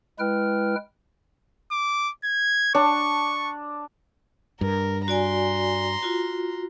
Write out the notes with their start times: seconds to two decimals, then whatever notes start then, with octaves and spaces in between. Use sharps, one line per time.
0.19 G#3 E4 B4 G5 F6
1.72 D6
2.24 G#6
2.75 D4 C#6
4.61 G2 A#4
5.08 F#4 D5 G#5 A#5 C6
6.03 F4 F#4